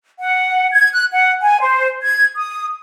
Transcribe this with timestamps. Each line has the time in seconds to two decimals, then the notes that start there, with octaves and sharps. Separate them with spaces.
0.19 F#5
0.72 G#6
0.93 F#6
1.12 F#5
1.41 G#5
1.60 C5
2.03 G#6
2.36 D#6